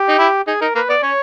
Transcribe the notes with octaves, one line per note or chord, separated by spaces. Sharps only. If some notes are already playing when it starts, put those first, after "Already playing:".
Already playing: G4
D#4
E4
D#4 G#4
D#4 A#4
A#3 B4
B3 D5
C#4 C#5